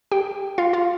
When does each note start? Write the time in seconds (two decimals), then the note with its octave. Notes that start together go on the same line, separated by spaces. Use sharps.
0.11 G4 G5
0.58 F4 F5
0.73 F4 F5